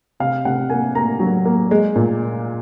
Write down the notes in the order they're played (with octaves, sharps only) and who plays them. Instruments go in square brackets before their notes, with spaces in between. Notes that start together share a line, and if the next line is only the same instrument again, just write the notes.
[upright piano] C3 F5
C3 F#5
A#3 G#5
A#3 A#5
F#3
A#3
G#3
A#2